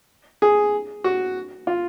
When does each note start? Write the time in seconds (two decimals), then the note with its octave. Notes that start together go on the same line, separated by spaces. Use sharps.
0.42 G#4
1.04 F#4
1.67 F4